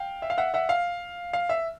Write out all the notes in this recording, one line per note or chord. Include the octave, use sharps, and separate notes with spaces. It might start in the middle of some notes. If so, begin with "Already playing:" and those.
Already playing: F5 G5
E5
F5
E5 F#5
E5 F#5
F5
F5
E5